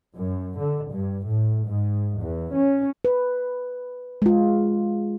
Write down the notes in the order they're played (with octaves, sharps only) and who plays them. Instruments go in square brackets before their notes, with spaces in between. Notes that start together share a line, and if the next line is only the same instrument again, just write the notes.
[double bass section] F#2
D3
G2
A2
G#2
E2
C#4
[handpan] B4
G#3 F4